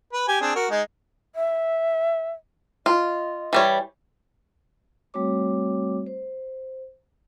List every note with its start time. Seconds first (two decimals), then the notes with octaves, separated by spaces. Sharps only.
0.13 B4
0.28 G4 G#5
0.41 C4 D4 G#4
0.56 F#4 A#4
0.70 G#3 D#4
1.35 E5
2.86 F4 D#5
3.53 E3 G3 C#5
5.14 G3 A3 C4 F#4 C#5 D6
6.07 C5